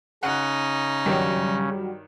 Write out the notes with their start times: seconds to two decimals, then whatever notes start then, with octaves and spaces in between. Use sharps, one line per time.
0.23 C#3 C#4 D#4 F#5 F#6
1.06 G2 D#3 F#3 G3